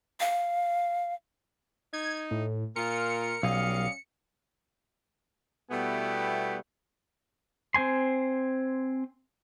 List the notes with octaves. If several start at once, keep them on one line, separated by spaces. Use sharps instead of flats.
F5
D#4 G#6
A2
A#2 F4 A#4 C#7
B1 G3 C#4 D#5 F5
B2 G3 A3 B3 E4 G4
C4 C5 G#5 C6